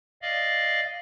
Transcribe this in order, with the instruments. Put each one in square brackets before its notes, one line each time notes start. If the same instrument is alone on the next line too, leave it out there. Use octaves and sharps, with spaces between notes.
[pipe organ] D5 D#5 F5